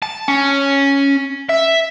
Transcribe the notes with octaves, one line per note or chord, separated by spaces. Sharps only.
A5
C#4
E5